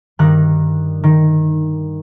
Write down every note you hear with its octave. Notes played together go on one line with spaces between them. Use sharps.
G2 D#3 G3 D#4 F#6
D#3